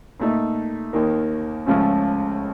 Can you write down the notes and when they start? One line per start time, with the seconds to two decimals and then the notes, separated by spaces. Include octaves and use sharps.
0.20 A#2 A3 D#4
0.93 D#2 D#3 A#3
1.66 C#2 C#3 F3 A3 C#4